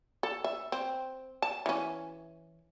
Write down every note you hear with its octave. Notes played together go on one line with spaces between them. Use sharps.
A4
E5
C4
A5
E3 C#4